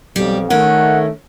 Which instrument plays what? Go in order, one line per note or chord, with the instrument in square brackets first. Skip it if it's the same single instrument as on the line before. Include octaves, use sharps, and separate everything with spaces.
[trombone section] B1 F2 [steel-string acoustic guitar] G3 G4
[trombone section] D#3 A3 [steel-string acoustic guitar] C#4 A#4 [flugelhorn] F#5